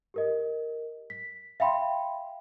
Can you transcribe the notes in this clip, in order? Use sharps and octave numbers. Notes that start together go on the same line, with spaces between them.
G4 A#4 D#5
B6
E5 F5 G5 B5 C6